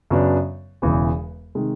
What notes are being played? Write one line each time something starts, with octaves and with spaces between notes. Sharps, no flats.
F#2 C#3 F#3 B3 D4
E1 E2 C#3 E3
C3 D#3 G#3